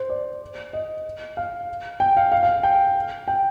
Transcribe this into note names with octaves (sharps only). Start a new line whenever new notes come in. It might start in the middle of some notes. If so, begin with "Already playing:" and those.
Already playing: C5
D5
D#5
F5
G5
F5
F5
F5
G5
G5